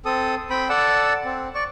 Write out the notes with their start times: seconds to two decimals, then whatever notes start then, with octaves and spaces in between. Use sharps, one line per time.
0.05 C4 A4 D#6
0.50 C4 G5 B5
0.69 A4 D5 F#5 A5 E6
1.25 C4
1.55 D5 C#6